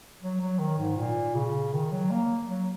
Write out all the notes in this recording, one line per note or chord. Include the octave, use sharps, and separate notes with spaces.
F#3
F#3
D#3
G#2
A#2
C#3
D#3
F#3
A#3
F#3